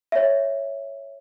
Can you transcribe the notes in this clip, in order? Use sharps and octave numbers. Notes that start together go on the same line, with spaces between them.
C#5 E5